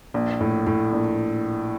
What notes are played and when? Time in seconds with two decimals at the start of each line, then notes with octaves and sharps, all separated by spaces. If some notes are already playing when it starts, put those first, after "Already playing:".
0.14 A#1
0.40 A2
0.67 A2
0.93 A#1